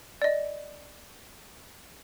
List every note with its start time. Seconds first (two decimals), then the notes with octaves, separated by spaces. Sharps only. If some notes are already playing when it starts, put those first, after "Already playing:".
0.22 D5 D#5